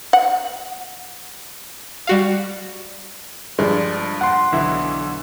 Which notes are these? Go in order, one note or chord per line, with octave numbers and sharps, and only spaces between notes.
F#5
G3 F#4 F5
G2 F3 G#3 D4
F#5 C6
B1 D3 E3 E4